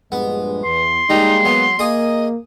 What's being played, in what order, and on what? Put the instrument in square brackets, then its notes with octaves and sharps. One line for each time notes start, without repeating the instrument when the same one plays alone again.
[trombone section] A#1 G2 G#3 [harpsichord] B3
[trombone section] E2 [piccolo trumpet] C6
[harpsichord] G3 [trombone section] G#3 A#3 [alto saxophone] D#4
[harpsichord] F#3 [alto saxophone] B3
[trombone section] A#3 [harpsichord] G#4 D#6 [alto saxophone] D#5